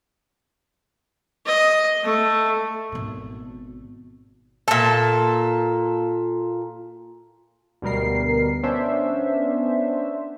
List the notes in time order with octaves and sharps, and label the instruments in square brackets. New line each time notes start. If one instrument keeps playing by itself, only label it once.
[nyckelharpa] D#5
A3
[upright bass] G#1 B2
[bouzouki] A#2 A4
[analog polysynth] D2 B2 G3 A#4 C7
B3 C#4 D4 C5 E5